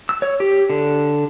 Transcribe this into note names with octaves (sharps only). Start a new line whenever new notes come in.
E6
C#5
G4
D3